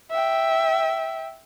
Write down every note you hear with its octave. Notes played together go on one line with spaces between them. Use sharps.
E5 G5